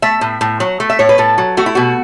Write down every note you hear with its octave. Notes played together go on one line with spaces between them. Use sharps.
A3 E5
A2
A2
F#3
A3
E5
A2 C#5
B4
A2 A4
F#3
A3 F#4
E4
B2 F#4